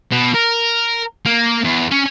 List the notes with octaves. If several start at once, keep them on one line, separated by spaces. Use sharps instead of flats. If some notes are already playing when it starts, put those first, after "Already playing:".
B2
A#4
A#3
E2
C#4